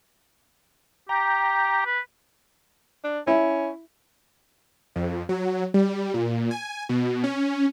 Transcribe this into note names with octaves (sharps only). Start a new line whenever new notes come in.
G4 G5 A#5
B4
D4
C#4 E4
F2
F#3
G3
A#2
G#5
B2
C#4